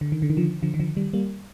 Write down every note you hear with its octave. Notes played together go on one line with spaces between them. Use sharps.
D3
D#3
D3
D#3
D3 F3
D3 F3
D#3
D3 F3
D#3 G3
G3 A#3